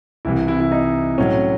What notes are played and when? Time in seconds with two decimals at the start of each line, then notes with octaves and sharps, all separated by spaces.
0.25 C2 C3 E3 E4
0.48 E4
0.60 E4
0.72 D#4
1.18 A2 F#3 C#4